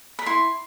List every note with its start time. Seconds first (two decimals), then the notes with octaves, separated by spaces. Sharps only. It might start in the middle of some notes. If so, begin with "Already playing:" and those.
0.19 B5
0.26 E4 C6